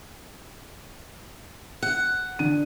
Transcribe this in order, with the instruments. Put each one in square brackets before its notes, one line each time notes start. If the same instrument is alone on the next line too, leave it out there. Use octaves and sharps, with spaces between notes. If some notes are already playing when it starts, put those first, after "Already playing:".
[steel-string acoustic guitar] F#5
[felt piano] D3 D#7